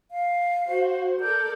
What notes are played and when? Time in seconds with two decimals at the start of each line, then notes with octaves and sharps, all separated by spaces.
0.11 F5
0.66 F#4 C5
1.20 A4 A#4 D5 G6